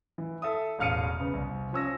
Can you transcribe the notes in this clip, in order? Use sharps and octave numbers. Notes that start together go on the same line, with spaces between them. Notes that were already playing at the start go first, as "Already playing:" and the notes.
E3
A4 E5 D#6
E1 A1 F5 F6 C#7 D#7
C#3 B3
C2
F3 C#4 E6 A#6